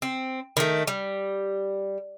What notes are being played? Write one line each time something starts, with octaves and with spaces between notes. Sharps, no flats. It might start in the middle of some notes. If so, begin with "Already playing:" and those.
C4
D#3 A3
G3